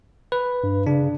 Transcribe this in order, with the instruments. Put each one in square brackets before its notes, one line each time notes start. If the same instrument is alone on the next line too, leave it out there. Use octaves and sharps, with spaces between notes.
[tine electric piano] B4
[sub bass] G2
[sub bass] C#3 [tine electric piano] D4